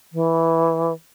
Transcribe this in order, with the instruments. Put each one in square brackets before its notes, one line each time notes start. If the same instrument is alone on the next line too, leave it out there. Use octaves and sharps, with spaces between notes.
[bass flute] E3